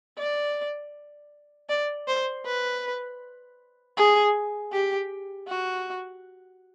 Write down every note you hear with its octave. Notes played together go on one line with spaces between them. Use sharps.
D5
D5
C5
B4
G#4
G4
F#4